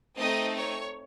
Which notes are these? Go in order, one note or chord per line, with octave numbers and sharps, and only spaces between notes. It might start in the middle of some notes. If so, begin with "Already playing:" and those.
A3 C4 D#4 D#5 D#6
C#5 C#6